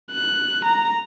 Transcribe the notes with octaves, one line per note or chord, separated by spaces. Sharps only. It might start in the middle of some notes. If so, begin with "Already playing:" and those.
F#6
A#5